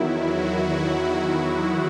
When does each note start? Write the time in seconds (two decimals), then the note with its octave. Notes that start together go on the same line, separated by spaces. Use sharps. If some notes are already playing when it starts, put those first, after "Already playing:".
Already playing: E2 D#3 F#3 E4
0.25 F#3 F#4